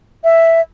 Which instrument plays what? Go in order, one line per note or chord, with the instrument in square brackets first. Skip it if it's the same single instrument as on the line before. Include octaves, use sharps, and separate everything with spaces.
[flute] E5